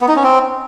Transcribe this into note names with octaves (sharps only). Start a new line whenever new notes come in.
B3
D#4
C#4
C4